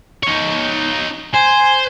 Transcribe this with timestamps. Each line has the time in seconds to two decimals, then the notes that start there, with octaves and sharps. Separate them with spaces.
0.23 D#4 C#5
1.34 C5 G#5